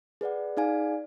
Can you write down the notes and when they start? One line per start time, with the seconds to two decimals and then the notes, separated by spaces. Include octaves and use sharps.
0.21 G#4 B4 D5 F#5
0.57 D#4 G#4 D5 F5 G#5